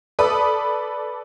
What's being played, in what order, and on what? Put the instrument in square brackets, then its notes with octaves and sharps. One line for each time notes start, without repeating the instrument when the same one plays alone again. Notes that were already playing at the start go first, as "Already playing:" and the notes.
[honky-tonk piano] A4 B4 D5 B5 D#6